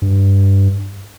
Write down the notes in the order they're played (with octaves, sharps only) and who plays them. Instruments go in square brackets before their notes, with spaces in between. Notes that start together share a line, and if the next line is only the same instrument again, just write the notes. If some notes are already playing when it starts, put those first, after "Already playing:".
[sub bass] G2